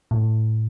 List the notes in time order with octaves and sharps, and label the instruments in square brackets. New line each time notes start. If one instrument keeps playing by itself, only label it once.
[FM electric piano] A2